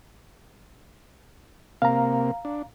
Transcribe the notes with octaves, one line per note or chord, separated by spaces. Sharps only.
C3 A#3 F5 A#5
D4